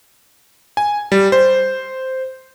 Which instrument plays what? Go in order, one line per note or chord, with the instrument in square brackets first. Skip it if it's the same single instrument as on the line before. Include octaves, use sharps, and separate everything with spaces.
[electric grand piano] G#5
G3
C5